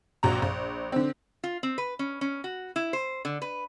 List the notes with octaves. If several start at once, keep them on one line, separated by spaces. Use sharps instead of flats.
A#1 A#2 F#4 A#5
A#1
D3 C4
F4
C4
B4
C#4
C#4
F#4
E4
C5
D3
B4